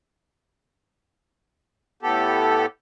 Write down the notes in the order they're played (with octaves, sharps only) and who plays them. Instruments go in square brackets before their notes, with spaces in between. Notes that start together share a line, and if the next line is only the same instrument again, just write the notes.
[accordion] A2 B3 G4 A4